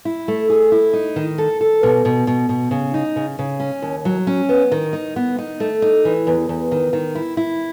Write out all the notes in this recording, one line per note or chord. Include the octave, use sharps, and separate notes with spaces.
E4
A3
G#4
E4
D#4
D#3
A4
A4
B2
B2
B2
B2
C#3
D#4
C#3
C#3
C#4
D#2
F#3
C#4
B3
D#3
D#4
B3
D#4
A3
D#4
E3
E2
E2
D#3
D#3
E4
E4